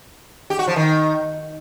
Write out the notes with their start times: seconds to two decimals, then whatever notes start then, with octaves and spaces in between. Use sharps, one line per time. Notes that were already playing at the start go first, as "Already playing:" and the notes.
0.50 G4
0.59 F#4
0.68 F3
0.76 D#3